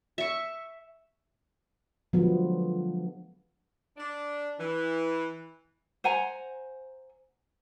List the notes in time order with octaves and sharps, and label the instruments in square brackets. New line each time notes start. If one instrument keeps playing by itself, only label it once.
[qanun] E5 C#6
[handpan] D3 F3 F#3 G#3 B3
[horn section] D4
E3
[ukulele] C5 F#5 G#5 A#5